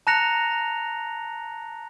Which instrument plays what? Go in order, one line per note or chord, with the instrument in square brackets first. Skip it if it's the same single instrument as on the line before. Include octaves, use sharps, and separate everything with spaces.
[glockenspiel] A5 A#5 F#6 A#6 C#7 F7